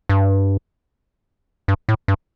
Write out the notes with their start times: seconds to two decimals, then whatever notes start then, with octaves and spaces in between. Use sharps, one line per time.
0.09 G2
1.68 G2
1.89 A2
2.08 G2